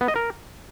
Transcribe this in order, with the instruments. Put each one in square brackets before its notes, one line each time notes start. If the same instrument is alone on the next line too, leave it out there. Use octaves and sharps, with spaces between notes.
[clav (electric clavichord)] B3
D#5
A#4